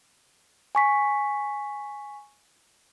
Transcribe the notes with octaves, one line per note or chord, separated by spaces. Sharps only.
G#5 C#6 B6